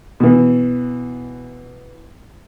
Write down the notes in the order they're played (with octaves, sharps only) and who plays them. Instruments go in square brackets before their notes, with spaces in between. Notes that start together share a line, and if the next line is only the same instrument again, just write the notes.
[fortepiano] B2 E3